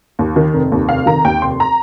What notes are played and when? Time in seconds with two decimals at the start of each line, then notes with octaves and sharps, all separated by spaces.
0.19 D#2
0.36 D#3
0.54 F1
0.72 D#2
0.89 F1 F5
1.06 D#3 A#5
1.25 D#2 G5
1.42 F1 C6
1.60 A#5